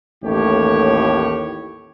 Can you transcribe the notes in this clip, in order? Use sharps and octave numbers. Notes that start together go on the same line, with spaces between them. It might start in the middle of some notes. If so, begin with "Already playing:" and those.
A1 D#2 A2 G4 C#5